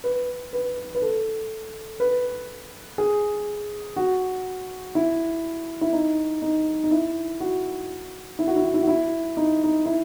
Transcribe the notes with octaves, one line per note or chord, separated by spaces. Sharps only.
B4
B4
B4
A4
B4
G#4
F#4
E4
E4
D#4
D#4
D#4
E4
F#4
E4
F#4
E4
F#4
E4
F#4
E4
D#4
D#4
E4